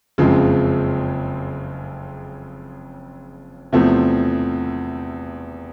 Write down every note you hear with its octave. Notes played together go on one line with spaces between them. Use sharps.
F#1 F2 C#3 F3 G#3
E2 C3 F3 A3 C4